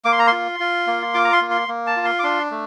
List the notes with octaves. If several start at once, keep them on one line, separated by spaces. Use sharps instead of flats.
A#3 D6
C6
A#5
F4 C6
F4
A#3
F4 D6
A#5
C6
A#3
C6
A#3
A5
F4
C6
D6
D4 C6
A3